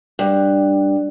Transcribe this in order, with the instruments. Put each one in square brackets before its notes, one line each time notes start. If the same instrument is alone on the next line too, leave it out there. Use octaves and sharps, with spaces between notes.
[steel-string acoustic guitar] G2